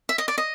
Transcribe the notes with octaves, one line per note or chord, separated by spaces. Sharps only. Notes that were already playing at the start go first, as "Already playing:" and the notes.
E5
D#5
D5
D#5